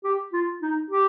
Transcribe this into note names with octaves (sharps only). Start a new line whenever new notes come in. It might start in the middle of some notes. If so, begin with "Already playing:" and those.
G4
F4
D#4
G4